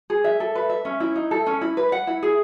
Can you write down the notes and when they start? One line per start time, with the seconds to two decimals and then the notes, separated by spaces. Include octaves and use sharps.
0.10 G#4
0.24 E5
0.40 A4
0.55 B4
0.69 E5
0.85 C#4
1.00 E4
1.16 D#4
1.31 A4
1.46 C#4
1.61 E4
1.77 B4
1.92 F#5
2.07 E4
2.23 G#4